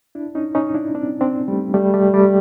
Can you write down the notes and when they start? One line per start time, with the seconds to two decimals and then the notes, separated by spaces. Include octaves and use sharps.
0.15 D4 E4
0.35 C#4 D#4
0.55 C#4 D#4
0.74 D4 E4
0.94 C4 D4
1.21 C4 D4
1.48 G3 A3
1.74 G3 A3
1.94 G3 A3
2.14 G3 A3